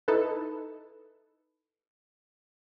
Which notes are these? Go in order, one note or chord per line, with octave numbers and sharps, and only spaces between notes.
D#4 E4 A4 B4